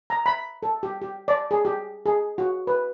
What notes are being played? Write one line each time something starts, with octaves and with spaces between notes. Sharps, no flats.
A#5
B5
A4
G4
G4
D5
G#4
G4
G#4
F#4
B4